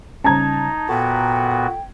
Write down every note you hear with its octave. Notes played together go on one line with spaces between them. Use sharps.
C#3 G3 C#4 D#4 A5 A#5 G#6
A#2 B3 F#4 A4 G5